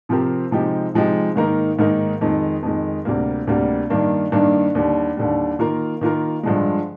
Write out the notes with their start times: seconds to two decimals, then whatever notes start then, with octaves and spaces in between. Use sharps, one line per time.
0.09 C3 F3 C4 G4 A#4
0.51 C3 F3 G#3 D#4 G4
0.94 C3 F3 G#3 D#4 G4
1.36 G#2 D#3 A#3 D#4 A#4
1.79 G#2 D#3 A#3 D#4 A#4
2.21 F2 D#3 G#3
2.63 F2 D#3 G#3
3.05 D2 C3 G3 A#3
3.47 D2 C3 G3 A#3
3.90 G2 D#3 A#3 D4
4.32 G2 D#3 A#3 D4
4.75 D#2 D3 G3
5.17 D#2 D3 G3
5.59 D#3 A#3 F4 A#4
6.01 D#3 A#3 F4 A#4
6.43 G2 D3 F3 G#3